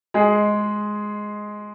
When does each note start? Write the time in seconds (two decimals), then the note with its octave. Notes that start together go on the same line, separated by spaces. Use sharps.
0.14 G#3 G#4